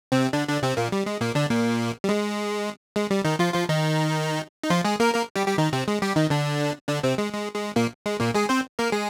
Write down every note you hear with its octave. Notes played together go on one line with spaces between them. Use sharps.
C3 C4
D3 D4
D3 D4
C3 C4
A#2 A#3
G3
G#3
A#2 A#3
D3 D4
A#2 A#3
G3
G#3
G#3
G3
D#3 D#4
F3 F4
F3 F4
D#3 D#4
D#4
F3 F4
G#3 G#4
A#3 A#4
A#3 A#4
G3 G4
G3 G4
D#3 D#4
C3 C4
G#3
G3 G4
D#3 D#4
D3 D4
D3 D4
C3 C4
G#3
G#3
G#3
A#2 A#3
G#3
A#2 A#3
G#3 G#4
C4 C5
A#3 A#4
G#3 G#4